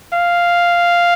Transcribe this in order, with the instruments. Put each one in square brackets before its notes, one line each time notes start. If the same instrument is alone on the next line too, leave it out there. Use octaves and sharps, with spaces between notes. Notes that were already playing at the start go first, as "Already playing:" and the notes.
[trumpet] F5